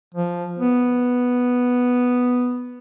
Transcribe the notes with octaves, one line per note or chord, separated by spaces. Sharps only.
F3
B3